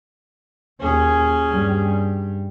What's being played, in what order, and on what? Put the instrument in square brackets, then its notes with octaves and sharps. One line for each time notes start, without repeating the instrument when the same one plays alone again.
[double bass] D#2 A#2 [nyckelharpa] C#4 G#4
[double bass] G2 G3